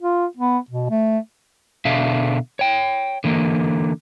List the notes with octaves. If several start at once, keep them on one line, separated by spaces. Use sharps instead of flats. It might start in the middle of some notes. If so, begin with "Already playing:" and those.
F4
B3
B2
A3
B2 D3 D4 E5 F5
C#5 G5
D3 E3 A#3